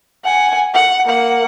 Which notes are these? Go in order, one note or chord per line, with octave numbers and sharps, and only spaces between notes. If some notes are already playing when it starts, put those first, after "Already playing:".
F#5 G#5
F#5
A#3 F#5